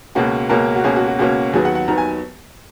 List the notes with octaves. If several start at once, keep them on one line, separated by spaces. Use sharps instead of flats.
C#2 B2 A#3 C#4 F#4
C#2 B2 A#3 C#4 A#4
F#4
C#2 B2 A#3 C#4 G#4
F#4
F#4
C#2 B2 A#3 C#4 F#4
D#2 D#3 F#3 B3 G#4
F#5
F#5
D#2 D#3 F#3 B3 A#5
G#5